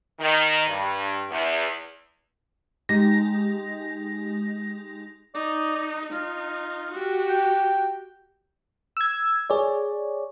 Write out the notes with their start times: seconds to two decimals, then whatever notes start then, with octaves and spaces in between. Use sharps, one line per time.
0.19 D#3
0.67 G2
1.30 E2
2.89 G#3 D#4 G4 A#6
5.34 D#4 D5
6.13 D#4 F4
6.92 F#4 G4
7.29 G5
8.97 E6 G#6
9.50 G#4 C#5 D5